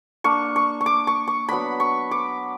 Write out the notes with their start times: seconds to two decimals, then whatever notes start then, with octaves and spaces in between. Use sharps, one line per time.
0.24 A#3 D4 C#6
0.56 C#6
0.81 C#6
0.86 D6
1.07 C#6
1.28 C#6
1.49 F#3 B3 D4 B5
1.80 C#6
2.11 D6